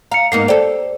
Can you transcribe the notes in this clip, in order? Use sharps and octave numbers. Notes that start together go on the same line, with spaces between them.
F5 A#5 C#7
G#2 A#3 B3 C7
G4 A4 C5 D5